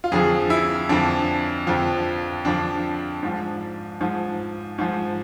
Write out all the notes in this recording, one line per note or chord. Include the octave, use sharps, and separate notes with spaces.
F4
F2 D3 F3 G#4
E4
F2 D3 F3 D4
F2 D3 F3
F2 D3 F3 D4
G#2 F3
G#2 F3
G#2 F3